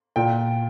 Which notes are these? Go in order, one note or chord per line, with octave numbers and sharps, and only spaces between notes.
A#2 G5